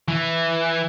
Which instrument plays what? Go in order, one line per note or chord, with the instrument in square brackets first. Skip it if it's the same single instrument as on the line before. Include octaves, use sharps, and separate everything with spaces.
[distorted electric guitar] E3